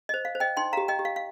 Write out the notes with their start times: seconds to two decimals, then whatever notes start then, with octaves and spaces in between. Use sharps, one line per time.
0.09 D#5
0.14 C5
0.25 F5
0.35 C5
0.40 D#5 G5
0.57 D#4 G5 C6
0.73 F5 A#5
0.77 G4
0.88 D#5 G5
0.99 G4
1.05 F5
1.16 F5